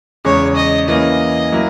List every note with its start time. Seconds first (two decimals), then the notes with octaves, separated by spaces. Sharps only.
0.25 E2 C#3 G#3 C#5
0.56 D#5
0.88 E3 A#3 C#4 D#5
1.52 F#3 A#3 E4